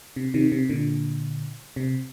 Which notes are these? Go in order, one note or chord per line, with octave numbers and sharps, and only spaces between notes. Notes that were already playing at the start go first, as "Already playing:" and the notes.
C3
C3 D#3
C3
A#2 D3
C3